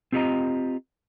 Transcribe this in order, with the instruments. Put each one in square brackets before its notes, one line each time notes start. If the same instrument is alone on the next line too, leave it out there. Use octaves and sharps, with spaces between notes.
[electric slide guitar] C4 F4 G4 C#5 D#5 A#5